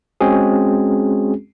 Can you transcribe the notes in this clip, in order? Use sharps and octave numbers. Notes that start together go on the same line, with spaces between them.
G#3 C4 C#4 F#4 G#4